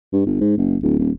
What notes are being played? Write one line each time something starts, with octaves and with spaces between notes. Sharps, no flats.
G2
G1
G#2
F#1
D1
D#1